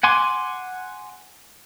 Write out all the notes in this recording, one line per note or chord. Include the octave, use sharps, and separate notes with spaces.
F#5 G#5 C6 D6